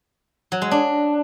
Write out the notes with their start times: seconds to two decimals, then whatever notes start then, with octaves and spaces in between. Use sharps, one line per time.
0.52 F#3
0.62 G#3
0.71 D4